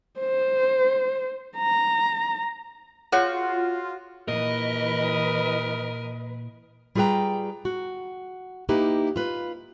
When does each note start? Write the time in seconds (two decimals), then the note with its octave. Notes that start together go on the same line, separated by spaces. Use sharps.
0.20 C5
1.57 A#5
3.12 F4 F#4 G#4 C#5
4.28 A#2 E3 A#4 B4 D#5
6.95 G3 F4 G#4 B4 G5 A#5
7.65 F#4
8.69 A#3 D#4 E4 G4 B4
9.16 F4 B4